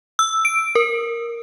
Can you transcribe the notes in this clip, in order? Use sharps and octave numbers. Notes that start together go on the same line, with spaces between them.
E6
D7
A#4